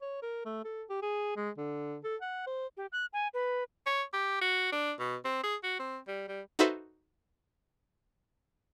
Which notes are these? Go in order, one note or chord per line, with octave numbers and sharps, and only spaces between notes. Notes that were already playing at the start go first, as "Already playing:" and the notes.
C#5
A#4
A3
A4
G4
G#4
G#3
D3
A4
F#5
C5
G4
F#6
G#5
B4
C#5
G4
F#4
D4
B2
C4
G#4
F#4
C4
G3
G3
D#4 F#4 A4 B4 C5 E5